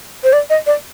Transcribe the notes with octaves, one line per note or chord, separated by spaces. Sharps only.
C5
D5
D#5
D5